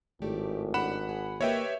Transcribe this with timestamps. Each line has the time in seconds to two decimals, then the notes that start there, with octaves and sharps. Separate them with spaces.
0.22 G#1 A2 A3 G4 D5
0.74 D4 G4 F#5 B5 E7
1.09 G#4
1.41 A#3 G4 B4 C#5 D#5 E5 G5